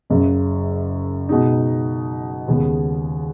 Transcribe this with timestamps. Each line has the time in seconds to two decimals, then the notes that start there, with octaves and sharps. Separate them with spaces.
0.10 F#1 F#2 C#3
1.29 B2 G#3 D#4
2.48 D#2 C#3 G#3 B3 G#4